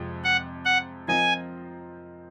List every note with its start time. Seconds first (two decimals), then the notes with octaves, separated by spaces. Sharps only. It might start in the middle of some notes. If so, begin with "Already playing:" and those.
Already playing: F2 C3 F3 G#3
0.24 F#5
0.65 F#5
1.08 F3 C4 F4 A#4 D#5 G#5